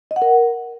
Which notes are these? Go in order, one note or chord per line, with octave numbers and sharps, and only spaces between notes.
D#5
F#5
A#4